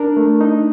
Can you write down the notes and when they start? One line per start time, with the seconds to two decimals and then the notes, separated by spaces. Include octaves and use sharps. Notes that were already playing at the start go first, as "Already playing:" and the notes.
Already playing: D4 A#4
0.17 A3
0.41 D#4